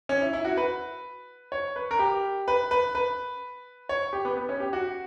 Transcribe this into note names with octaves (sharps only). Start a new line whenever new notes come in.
C#4
E4
E4
F#4
B4
C#5
B4
A#4
G4
B4
B4
B4
C#5
G4
B3
B3
C#4
G4
F#4